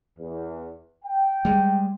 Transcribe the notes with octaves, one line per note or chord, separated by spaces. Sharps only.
E2
G5
G3 G#3